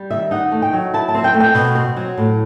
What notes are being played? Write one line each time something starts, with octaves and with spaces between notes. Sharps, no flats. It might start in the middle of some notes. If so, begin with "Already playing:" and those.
Already playing: G3
D#3 E5
D#4 F#5
A3
G5
F#3
E4 A5
A5
C4
G5
A3
G5
B2
C4
F#3
A2